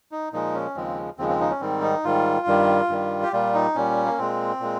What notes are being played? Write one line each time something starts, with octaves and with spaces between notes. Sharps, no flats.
D#4
A#2 F3 G#3 D#4
C#4
D#2 C#3 F3 G#3 C4
D#2 C#3 F3 G#3 C4
C4
D#4
C#4
G#2 D#3 G3 C4
D#4
G#2 D#3 G3 F4
G2 D#3 G3
G2 D#3 G3
G4
A#2 G3 F4
D#4
A#2 G3 C#4
A#3
A#2 G#3 C4
A#2 G#3